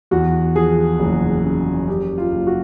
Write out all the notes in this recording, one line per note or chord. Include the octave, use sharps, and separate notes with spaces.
E2 F#4
F3 G#4
F#1
C#3
F#2 G4
F4
F#1
F#4